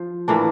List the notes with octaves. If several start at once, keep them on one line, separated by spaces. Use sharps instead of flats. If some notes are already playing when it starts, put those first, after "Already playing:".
Already playing: F3
A2 E3 A#3 D4